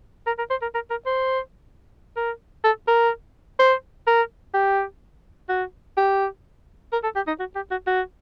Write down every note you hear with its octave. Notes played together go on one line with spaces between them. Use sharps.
A#4
A#4
C5
A#4
A#4
A#4
C5
A#4
A4
A#4
C5
A#4
G4
F#4
G4
A#4
A4
G4
D#4
F#4
G4
F#4
F#4